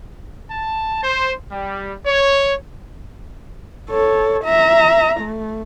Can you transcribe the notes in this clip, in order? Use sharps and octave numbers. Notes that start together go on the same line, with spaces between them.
A5
C5
G3
C#5
A4 C#5
E5 A#5
A3